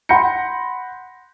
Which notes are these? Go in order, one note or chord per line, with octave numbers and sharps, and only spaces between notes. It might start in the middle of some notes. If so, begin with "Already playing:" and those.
F#5 B5 C6 G6 A#6 C#7